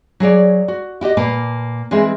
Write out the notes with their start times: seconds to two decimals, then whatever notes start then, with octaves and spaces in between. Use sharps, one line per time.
0.20 F#3 G#4 C#5 D5
0.68 F#4
1.01 E4 F#4 G4 D#5
1.17 A#2 A#3 B4 A5
1.91 E3 G#3 C4 G#4 A#4 E5